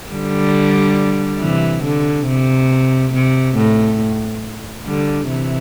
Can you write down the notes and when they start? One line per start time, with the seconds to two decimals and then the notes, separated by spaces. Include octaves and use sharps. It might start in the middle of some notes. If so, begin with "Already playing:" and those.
0.11 D3 G3
1.41 C3 E3
1.84 D3
2.28 C3
3.14 C3
3.56 A2
4.86 D3 G3
5.29 C3 E3